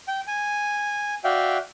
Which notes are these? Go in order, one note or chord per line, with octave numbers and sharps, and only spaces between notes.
G5
G#5
F#4 D5 E5 F5 G5